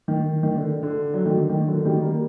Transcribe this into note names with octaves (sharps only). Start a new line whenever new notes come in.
D#3
D#3
D3
D3
D3 F#3
D#3
D3
D#3
D3 F#3
D#3 G3
G3 A#3